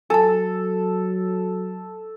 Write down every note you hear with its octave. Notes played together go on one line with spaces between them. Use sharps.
F#3 A4 G#5 A5